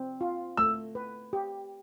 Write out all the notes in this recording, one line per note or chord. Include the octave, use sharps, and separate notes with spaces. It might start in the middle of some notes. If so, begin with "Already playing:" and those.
Already playing: C4
F4
A3 E6
B4
G4